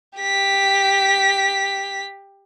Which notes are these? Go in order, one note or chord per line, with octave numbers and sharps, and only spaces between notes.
G4 B6